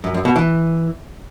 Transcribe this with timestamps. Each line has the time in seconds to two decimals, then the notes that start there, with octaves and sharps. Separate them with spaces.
0.04 F#2
0.14 F#2
0.25 B2
0.36 E3